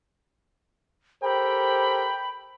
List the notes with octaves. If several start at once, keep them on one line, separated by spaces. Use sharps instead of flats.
G4 A4 A#4 C5 G5 B5